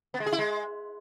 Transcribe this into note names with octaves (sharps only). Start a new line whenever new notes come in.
B3
G#3
G#4
E4
G#3